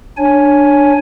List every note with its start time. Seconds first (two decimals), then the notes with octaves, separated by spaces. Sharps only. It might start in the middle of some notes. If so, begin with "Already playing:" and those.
0.17 D4 C#5 G#5